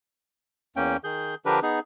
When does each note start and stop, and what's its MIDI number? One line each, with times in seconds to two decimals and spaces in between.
0.76 0.97 40
0.76 0.97 58
0.76 0.97 61
0.76 0.97 79
1.04 1.35 51
1.04 1.35 68
1.04 1.35 91
1.46 1.60 50
1.46 1.60 53
1.46 1.60 62
1.46 1.60 67
1.46 1.60 70
1.46 1.60 71
1.63 1.80 59
1.63 1.80 63
1.63 1.80 68